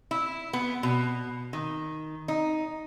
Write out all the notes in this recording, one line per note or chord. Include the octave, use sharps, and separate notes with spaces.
E4
B3
B2
D#3
D#4